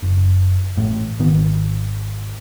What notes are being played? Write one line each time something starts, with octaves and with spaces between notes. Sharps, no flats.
F#1
A1 A2
G#1 D#3 B3